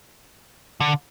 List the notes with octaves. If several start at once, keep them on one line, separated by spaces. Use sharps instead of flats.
D3